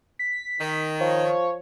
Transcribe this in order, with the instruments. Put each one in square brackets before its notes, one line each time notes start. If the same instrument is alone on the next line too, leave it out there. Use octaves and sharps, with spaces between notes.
[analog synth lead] B6
[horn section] D#3
[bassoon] F3 [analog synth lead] C#5